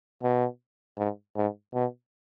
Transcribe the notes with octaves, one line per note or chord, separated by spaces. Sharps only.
B2
G#2
G#2
B2